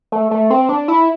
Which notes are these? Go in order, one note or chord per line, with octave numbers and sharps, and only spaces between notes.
A3
A3
C4
D4
E4